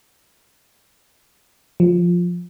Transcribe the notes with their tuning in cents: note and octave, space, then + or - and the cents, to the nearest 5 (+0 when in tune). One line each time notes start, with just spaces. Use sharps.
F3 +5